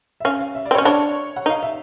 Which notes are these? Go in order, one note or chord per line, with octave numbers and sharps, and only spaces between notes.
E5
C#4 F5
F5
E5
D5
C4
C#5
C#4 C5
D4 C#5
F#5
D#4 F5
E5